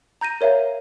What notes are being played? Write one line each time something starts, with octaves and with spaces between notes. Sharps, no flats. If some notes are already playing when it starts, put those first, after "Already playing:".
A#5 G6 A#6 D#7
A#4 C#5 E5 F5 A#5